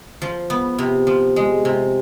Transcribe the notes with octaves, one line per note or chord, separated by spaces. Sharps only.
F3
B3
C3
F3
G#3
C3